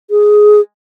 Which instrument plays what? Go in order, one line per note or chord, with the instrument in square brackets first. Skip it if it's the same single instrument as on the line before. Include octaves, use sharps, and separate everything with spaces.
[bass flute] G#4